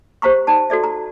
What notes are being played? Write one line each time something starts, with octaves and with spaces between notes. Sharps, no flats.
G4 C5 F5 A#5 C#6
D#4 D5 A5
F#4 A4 D5 E5
A#5